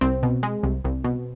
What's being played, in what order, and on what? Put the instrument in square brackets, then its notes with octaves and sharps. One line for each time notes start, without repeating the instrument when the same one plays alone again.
[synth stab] C2 C4
B2
G#3
C2
C2
B2